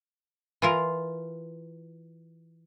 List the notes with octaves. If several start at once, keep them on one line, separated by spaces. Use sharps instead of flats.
E3 F4 A#4